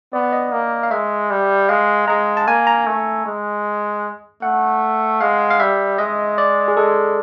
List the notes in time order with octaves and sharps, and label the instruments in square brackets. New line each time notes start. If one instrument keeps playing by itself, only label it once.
[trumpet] B3 [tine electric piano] D5
[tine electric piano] D#5
[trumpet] A#3
[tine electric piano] F5
[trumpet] G#3 [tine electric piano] E5
[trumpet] G3
[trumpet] G#3 [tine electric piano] F5
[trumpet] G#3 [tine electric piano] A#5
[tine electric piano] A5
[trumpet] A#3 [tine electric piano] G#5
[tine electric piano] A#5
[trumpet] A3
G#3
[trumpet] A3 [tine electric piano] F#5
[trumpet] G#3 [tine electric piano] F5
[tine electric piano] F5
[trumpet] G3 [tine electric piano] E5
[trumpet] G#3 [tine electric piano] D#5
[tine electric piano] D5
G#4
[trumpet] G#3 [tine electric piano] A4